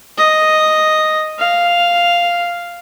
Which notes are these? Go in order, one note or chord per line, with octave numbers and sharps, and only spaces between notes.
D#5
F5